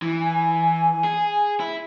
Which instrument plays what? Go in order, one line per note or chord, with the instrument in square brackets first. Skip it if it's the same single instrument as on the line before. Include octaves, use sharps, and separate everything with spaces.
[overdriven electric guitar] E3
[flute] G#5
[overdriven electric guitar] G#4
E4